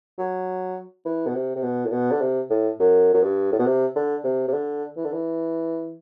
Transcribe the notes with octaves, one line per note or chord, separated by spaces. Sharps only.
F#3
E3
B2
C3
C3
B2
A2
B2
D3
C3
A2
F#2
F#2
G2
A2
B2
C3
D3
C3
C3
D3
E3
D3
E3